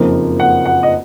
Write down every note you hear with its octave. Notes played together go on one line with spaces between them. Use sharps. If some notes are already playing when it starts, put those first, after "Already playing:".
Already playing: F#1 F2 F3 A#3 D#4
F#5
F#5
D#5